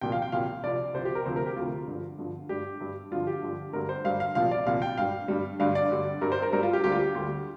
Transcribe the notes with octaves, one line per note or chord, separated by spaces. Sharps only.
C2 A#2 F3 G5
F5
G5
C2 A#2 F3 F5
C2 C3 F3 D5
C2 C3 F3 C5
G4
A#4
D2 C3 F3 C5
A#4
G4
D2 C3 F3 F4
G2 D3 F3
G2 D3 F3
G2 G3 G4
G2 G3
G2 D3 F3 F4
G4
G2 D3 F3
G2 D3 G3 A#4
C5
G2 D3 G3 F5
F5
C2 A#2 F3 F5
D5
C2 A#2 F3 F5
G5
G2 G3 F5
G2 G3
G2 D3 G3 F5
D5
G2 D3 G3
G2 G3 A#4
C5
A#4
G2 G3 A#4
F4
G4
D2 D3 G3 G4
F4
G4
D2 D3 G3